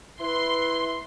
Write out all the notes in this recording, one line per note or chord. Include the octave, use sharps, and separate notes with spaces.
E4 B4 C6